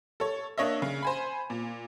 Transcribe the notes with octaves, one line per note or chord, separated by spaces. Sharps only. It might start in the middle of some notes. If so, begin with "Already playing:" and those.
A4 C#5
A#3 D4 C#5 D#5 E5
C#3
C5 G#5 B5
A#2